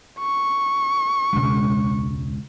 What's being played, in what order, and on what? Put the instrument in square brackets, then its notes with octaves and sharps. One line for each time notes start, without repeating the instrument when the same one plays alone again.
[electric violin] C#6
[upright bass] E1 C#2